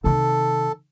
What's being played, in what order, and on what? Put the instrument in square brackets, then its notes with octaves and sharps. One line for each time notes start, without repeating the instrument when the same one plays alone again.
[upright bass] C3 D#3 [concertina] A4